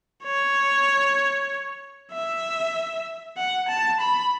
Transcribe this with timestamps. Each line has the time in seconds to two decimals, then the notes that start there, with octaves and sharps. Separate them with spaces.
0.24 C#5
2.12 E5
3.37 F#5
3.68 A5
4.00 B5